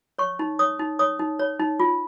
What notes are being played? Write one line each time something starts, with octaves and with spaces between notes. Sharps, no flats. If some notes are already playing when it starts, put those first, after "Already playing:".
C#5 C#6
D#4
C#5 D#6
D#4
C#5 D#6
D#4
C#5
D#4
F4